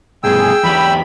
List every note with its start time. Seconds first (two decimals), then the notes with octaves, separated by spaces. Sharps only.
0.24 C2 G2 B2 G#4 G5 E6
0.63 E2 F#3 G4 B5